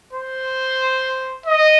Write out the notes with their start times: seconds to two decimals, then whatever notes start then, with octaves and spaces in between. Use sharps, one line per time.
0.13 C5
1.46 D#5